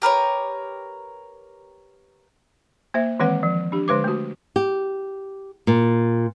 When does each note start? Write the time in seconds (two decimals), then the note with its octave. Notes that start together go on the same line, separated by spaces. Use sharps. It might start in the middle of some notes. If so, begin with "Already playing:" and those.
0.02 G4 A#4 B4 C#5
2.94 A#3 C5 E5
3.20 D#3 E3 G#3 C4 B4 F#5
3.43 F3
3.72 D4 G4
3.88 D3 G#3 B4 D6
4.04 A3 F#4
4.56 G4
5.67 A#2